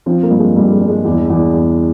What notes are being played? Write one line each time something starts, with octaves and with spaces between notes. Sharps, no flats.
F3 C4
A#3
G2
G#3
G2 G3
G#3
G2
G#3
E2
E2
E2